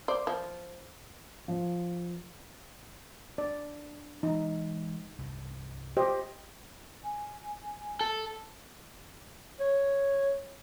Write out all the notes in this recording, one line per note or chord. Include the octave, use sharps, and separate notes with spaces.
C5 D5
F3
F3
D4 D5
E3 G#3 D#4
C2 G2
G4 C5 D#5
G#5
A4
C#5